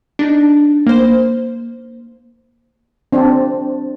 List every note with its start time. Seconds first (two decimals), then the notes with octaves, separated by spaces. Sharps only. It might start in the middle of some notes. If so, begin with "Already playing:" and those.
0.19 D4 D#4
0.87 A#3 C5
3.12 C4 D4